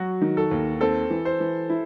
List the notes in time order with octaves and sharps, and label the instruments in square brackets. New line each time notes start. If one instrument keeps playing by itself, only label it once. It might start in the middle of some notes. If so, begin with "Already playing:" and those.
Already playing: [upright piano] F#3 [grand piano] F#4
[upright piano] D#3
[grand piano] A4
[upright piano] D#2
[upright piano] C4 [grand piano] A4
[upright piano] E3
[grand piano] C5
[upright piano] E3
E4